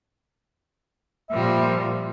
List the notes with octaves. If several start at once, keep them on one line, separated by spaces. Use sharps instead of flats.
A#2 F3 G3 E5